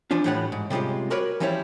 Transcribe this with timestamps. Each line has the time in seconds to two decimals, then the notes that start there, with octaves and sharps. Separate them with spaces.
0.11 E3 F3 C#4 D4 F4
0.24 A2 E3 G3 C#5 D5 F#5
0.52 G#2
0.70 C3 G3 G#3 C#4 F4
1.10 F#4 A#4 B4 C#5 D5
1.40 E3 F3 G3 C#4 E4 C#5